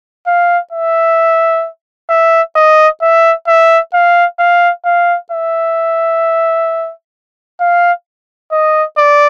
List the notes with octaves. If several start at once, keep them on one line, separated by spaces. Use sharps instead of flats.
F5
E5
E5
D#5
E5
E5
F5
F5
F5
E5
F5
D#5
D5